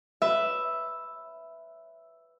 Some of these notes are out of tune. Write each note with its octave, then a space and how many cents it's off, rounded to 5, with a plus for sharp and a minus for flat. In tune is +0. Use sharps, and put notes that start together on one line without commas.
B4 +5 E5 +0